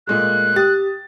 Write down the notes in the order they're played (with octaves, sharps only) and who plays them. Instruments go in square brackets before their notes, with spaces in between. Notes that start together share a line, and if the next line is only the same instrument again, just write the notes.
[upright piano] A#2 G#3 A3 [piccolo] F#6
[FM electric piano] G4 [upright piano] D#6 A6